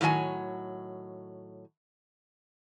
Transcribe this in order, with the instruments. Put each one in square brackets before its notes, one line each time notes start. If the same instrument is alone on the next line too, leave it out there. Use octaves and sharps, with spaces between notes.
[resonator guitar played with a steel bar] A2 D#3 F#3 E5 G#5